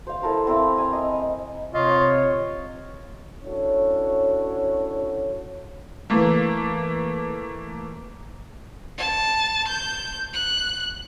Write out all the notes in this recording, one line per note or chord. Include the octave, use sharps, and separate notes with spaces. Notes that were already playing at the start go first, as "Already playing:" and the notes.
C5 F5
E4 A4 A#4 C5
C4 E4 A#4 F5
G#5 A#5
D#5
C3 F4 C#5 D#5
C#4 D4 E4 F#4 A4 C#5
E3 A3 A#3
A5
G6
F#6